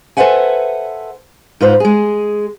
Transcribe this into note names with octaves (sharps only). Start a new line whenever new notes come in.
A4 B4 C5 E5 F#5 G#5
G#2 F4 B4 C5
G#3 G#4